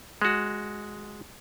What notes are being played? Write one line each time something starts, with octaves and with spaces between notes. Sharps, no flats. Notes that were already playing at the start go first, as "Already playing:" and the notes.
G#3 F#4